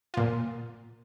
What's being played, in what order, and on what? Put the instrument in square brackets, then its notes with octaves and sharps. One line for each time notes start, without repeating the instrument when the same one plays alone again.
[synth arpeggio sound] A#2 F4